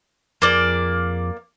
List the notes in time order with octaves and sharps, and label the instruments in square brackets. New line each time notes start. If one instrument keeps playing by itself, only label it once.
[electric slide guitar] F2 F3 G#4 [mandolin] A#3 D5